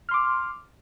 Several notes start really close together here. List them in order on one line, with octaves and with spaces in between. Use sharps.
F6 C6 D6